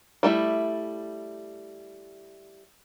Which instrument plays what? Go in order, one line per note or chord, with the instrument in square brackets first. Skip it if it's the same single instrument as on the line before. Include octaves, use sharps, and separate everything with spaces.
[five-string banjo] G3 A3 E4